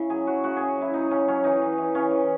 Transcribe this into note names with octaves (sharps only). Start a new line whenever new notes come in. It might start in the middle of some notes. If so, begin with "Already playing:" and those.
Already playing: C#3 E4
F#3 G#4
F#3 F#4
C#3 F#4
C#3 G#4
F#3 E4
F#3 D#4
C#3 C#4
F#3 C#4
E3 D#4
E3
E3
C#3 C#4
E3